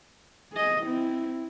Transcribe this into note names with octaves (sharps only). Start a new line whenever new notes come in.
G#4 D#5
C4 E4